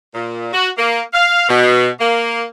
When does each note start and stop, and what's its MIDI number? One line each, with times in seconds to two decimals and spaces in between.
0.14 0.48 46
0.53 0.68 66
0.78 1.01 58
1.13 1.45 77
1.48 1.88 47
1.99 2.44 58